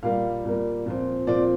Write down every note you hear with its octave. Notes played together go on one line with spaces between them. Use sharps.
A#2 G3 A#3 F5
A#2 G3 A#3
A#2 F3 C4
A#2 F3 C4 D5